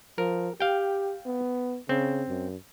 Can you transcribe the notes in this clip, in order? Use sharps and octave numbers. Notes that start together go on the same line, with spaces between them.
F3 A#4
G4 F5 G5
B3
C#3 C4
F#2